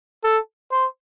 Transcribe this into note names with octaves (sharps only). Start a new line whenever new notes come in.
A4
C5